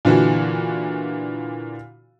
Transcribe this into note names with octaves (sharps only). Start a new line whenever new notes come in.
A#2 D3 E3 F#4